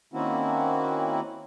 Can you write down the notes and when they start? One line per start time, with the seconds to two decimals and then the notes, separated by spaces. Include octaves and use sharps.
0.14 D#3 A#3 C4 C#4 E4 F#4